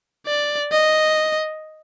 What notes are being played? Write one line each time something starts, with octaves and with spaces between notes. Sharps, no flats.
D5
D#5